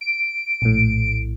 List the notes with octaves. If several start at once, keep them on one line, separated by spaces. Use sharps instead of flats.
D7
A#1 A2